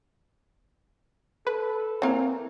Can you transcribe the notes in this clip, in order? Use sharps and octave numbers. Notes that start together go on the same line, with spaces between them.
A4 B4
E3 A#3 C4 A#4